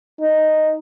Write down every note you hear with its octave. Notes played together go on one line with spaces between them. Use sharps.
D#4